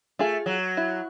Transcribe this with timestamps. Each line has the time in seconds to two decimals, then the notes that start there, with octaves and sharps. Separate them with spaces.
0.19 A3 F4 G#4
0.46 F#3
0.77 E4